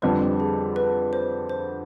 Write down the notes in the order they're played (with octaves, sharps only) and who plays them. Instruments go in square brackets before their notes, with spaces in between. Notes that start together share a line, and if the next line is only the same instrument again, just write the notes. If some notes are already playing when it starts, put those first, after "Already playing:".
[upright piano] F2 D3 G3 C4 [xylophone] B4
[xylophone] G#4
B4
C5
C5